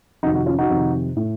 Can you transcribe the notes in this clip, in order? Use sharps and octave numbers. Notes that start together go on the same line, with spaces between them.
F2 C3 D#3 D#4 F#4
D#4 F#4
C#4 F4
D#4 F#4
F2 C3 D#3
A2